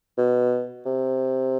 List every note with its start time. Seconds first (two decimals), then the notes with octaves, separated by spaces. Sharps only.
0.17 B2
0.86 C3